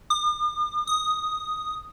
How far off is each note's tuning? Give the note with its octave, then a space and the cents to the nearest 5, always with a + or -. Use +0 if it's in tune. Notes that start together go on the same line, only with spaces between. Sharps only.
D#6 -45
D#6 +0